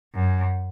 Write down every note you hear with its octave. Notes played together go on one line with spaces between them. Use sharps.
F#2